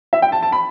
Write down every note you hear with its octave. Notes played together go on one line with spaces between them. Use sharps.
E5
G5
A5
A5
B5